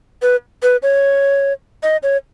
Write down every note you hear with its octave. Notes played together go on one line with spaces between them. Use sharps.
B4
B4
C#5
D#5
C#5